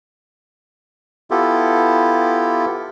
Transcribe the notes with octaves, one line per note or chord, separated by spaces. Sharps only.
B3 E4 F4 G4 A4